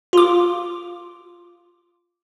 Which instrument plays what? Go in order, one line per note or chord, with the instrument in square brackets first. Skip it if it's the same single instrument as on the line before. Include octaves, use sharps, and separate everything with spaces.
[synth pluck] F4 D6